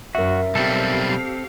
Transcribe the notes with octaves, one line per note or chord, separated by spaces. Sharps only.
F#2 F#4 A#4 E5
B1 G3 C4 G4 A4 F5